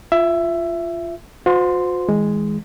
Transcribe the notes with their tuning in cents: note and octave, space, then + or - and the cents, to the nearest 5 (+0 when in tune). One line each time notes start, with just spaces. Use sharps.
F4 -15 E5 +15
F#4 -45 C5 -30 C6 -5
E3 -40 G#3 +0